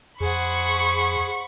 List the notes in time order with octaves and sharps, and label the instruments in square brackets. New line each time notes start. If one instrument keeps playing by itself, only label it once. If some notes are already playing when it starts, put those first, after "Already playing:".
[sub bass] F2 [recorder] G#4 [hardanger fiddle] C5 F#5 [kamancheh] B5 C#6